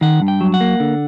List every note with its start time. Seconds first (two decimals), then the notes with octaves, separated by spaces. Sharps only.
0.01 D#3 F#5
0.22 G2
0.28 G5
0.41 F#3
0.54 F#5
0.60 A#3
0.80 D3